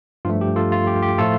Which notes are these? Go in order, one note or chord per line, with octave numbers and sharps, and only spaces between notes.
G2 F3 A3 F4
G4
F4 A4
F4
G4
G4
A2 F3 A3 F4 A4